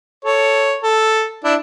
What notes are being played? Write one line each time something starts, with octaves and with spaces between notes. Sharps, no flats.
A4 C#5
A4
D4 E4